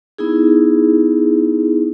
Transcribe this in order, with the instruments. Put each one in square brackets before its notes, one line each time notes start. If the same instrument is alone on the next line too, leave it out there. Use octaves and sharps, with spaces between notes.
[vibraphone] B3 D#4 E4 G#4